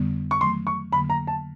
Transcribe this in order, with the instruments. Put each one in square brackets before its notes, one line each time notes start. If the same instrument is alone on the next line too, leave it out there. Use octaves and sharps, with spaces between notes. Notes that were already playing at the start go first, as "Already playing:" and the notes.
Already playing: [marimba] F2 D3 G3 B3
[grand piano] C#6
[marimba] D#3 F#3 A3 [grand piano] C6
[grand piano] C#6
[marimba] F2 D3 F#3 A#3 [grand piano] B5
[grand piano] A#5
A5